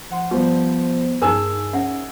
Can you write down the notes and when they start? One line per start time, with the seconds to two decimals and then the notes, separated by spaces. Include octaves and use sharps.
0.10 F3 F#5 C6
0.31 F3 G3 B3 C5
1.22 G2 D#4 G#4 A#4 G#5 E6
1.73 C#4 E5 F#5